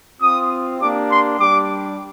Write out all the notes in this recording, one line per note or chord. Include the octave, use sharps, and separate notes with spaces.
C4 F4 D#6
A#3 D4 G4 D6
C6
G3 D4 G4 D6